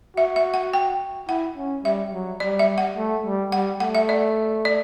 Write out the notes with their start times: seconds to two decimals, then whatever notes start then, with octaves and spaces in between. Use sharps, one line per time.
0.17 F#4 E5
0.36 E5
0.54 F#5
0.73 G5
1.28 E4 F#5
1.57 C#4
1.84 G3 E5
2.13 F#3
2.40 G3 D5
2.59 E5
2.78 F#5
2.97 A3
3.26 G3
3.52 G3 F#5
3.80 A3 F#5
3.95 E5
4.09 D5
4.65 D5